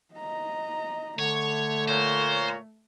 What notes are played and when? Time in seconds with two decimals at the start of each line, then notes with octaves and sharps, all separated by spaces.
0.15 D#5 A#5
1.19 D3 A3 C#5
1.88 A#2 C5 C#5 A#5